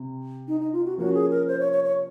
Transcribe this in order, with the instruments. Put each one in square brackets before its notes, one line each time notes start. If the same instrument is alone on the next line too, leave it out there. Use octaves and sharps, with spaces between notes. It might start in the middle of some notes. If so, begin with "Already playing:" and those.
Already playing: [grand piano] C3
[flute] D#4
D#4
F4
F#4
[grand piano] F3 A#3 C#4 [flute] F#4
[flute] G#4
A#4
C5
C#5
C#5
C#5